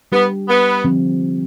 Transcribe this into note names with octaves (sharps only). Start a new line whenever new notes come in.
G3 B3 D4 G4
B3
D3 F3 C4